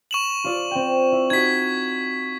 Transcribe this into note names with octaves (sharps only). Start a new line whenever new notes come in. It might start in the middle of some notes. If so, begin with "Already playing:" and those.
C#6 E7 F#7
F4 D5
C4 G5
E4
D#4 F#4 G#6 B6